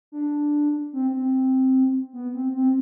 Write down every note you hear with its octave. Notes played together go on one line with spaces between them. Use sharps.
D4
C4
C4
B3
C4
C4